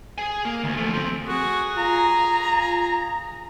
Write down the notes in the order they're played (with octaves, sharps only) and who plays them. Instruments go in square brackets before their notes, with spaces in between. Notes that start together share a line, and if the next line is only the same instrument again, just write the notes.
[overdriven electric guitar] G#4 G#5
A#3
D2
F3 A3
F3 C4
[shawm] F#4 [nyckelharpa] G#4
[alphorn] F4 [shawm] A#5